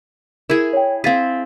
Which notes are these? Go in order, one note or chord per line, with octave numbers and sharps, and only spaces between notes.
E4 G#4 A#4
C#5 G5
C4 G#4 F5 A6 B6